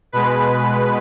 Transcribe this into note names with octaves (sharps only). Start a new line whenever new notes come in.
B2 G#3 B4